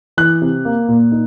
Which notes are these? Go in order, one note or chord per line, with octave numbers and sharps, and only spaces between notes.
E3 F#6
C3
A#3
A#2
D#4